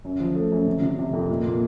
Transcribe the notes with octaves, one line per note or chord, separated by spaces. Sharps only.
F#2
F3
A3
F#2
C3
C3
C3
F2
A#2
A#2